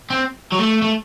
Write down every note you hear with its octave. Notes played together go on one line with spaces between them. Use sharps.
C4
F#3
A3
A3